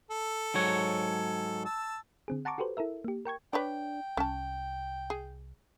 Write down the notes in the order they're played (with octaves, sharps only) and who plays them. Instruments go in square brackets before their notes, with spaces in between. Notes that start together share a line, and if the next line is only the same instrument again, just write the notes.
[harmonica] A4
[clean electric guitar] G#2 F#3 C#5
[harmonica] A5 E6
[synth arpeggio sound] D3 C4 G#4
F#5 A5 A#5 C#6 D6
F#4 G4 A4 B4 C5
E4 A4 A#4 E5
A#3 G4
A#4 G5 C#6 G#6
[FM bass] D4 [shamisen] B4 C#5 D5 [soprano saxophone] G5
[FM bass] C2 [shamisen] C#4 A5
[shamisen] G#4